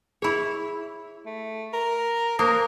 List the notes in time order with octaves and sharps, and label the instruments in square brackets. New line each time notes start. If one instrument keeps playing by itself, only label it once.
[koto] E4 C#5 [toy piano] G#4 B5
[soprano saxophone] A3
A#4
[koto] A#3 [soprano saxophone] A#4 [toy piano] C5 A5 D#6